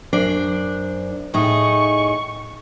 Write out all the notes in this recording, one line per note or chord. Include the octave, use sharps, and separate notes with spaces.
F#2 D4 C5
A2 D#4 G#4 C#6